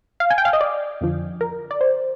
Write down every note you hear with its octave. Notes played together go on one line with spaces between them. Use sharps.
F5
G#5
G5
F5
D#5
D5
F2 D3 F3
A#4
D5
C5